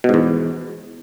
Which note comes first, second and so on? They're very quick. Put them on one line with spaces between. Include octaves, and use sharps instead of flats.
B2 G#2 E2